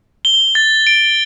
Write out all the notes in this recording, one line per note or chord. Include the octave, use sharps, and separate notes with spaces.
G7
A6
D7